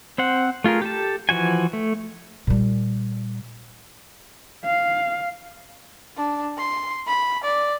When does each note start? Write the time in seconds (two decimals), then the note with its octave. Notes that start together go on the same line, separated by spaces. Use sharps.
0.18 C4 C5 F#5
0.64 A3 F4 G#4 A#4
0.82 G4 A4 A5
1.29 E3 F3 F#4 G#5
1.73 A3
2.47 A#2 G3
4.66 F5
6.17 D4
6.57 C6
7.07 B5
7.44 D5